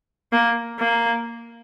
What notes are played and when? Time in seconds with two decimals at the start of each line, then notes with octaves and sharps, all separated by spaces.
0.32 A#3
0.80 A#3